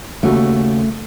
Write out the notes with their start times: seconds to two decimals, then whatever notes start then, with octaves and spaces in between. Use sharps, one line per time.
0.23 D#2 C#3 A3 F#4